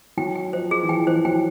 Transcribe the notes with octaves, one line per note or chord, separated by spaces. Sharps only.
F#3 G5
G5
F3 C5
G#4
E3
F3 G5
E3 C5
F#3 G5